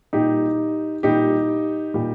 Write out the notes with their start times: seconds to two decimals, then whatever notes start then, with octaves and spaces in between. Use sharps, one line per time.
0.13 A#2 G3 D#4 G4
1.03 A#2 G3 D#4 G4
1.94 A#2 G3